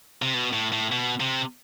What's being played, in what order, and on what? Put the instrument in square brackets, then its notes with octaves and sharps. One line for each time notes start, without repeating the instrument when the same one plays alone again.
[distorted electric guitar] C3
B2
A2
A2
B2
C3